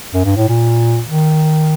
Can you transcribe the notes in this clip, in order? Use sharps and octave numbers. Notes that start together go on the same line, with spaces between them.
F#2
G2
A2
A#2
D#3